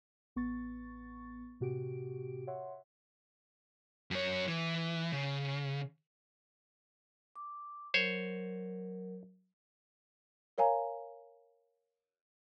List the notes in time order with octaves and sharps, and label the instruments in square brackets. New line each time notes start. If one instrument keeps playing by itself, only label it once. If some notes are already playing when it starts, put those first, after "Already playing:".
[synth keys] A1 B3 C#6 A6
A2 C3 F#4 G4 D7
C#5 E5 F#5 C6
[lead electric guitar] F#2 C#5
E3
C#3
[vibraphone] D6
[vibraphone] F#3 A#4 [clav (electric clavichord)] C5 C#5
[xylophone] A#4 C#5 F5 G#5 A#5